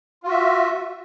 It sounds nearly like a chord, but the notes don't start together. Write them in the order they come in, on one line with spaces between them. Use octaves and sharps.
F4 F#4 E5